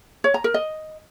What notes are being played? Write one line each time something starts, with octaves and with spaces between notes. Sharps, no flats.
C#5
A#5
A#4
D#5